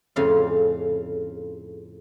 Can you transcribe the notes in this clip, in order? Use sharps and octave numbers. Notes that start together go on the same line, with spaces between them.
F2 A2 C#3 F4 F5 C6